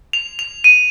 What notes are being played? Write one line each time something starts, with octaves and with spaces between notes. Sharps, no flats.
F7
F7
D#7